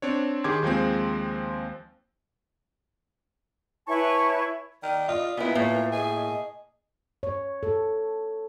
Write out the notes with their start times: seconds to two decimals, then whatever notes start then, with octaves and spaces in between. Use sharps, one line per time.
0.02 C4 D4 C#5
0.44 D#3 G4 G#4 C6 D6 G#6
0.63 D#2 F3 G#3 C4
3.87 E4 B4 C#5 G#5 A5 C#6
4.83 D#3 D5
5.08 F4 D#5 D#6
5.37 A#2 B3 E4 B4
5.55 A2 A#3
5.92 G#4 D#5
7.23 C#5
7.63 A4